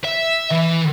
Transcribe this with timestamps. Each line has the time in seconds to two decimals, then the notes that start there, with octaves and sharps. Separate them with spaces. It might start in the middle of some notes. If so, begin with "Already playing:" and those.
0.04 E5
0.52 E3